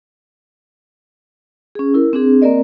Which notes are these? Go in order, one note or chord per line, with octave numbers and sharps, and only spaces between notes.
C#4 G#4
E4 A#4
C4 D4 G#4
A#3 C4 A#4 D5 D#5